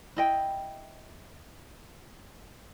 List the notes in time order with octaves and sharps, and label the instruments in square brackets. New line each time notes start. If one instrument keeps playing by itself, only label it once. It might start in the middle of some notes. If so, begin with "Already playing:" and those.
[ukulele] E4 D#5 G5